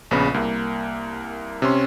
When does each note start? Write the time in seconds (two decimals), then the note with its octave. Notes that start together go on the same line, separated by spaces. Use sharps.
0.11 A#1 C#3 B3 B5
0.34 C2 A#3
1.62 C3 C#4 C6